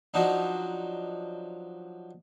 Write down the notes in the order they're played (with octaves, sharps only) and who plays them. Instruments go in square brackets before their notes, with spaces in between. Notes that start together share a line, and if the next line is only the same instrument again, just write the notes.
[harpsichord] F3 F#3 D4 D#4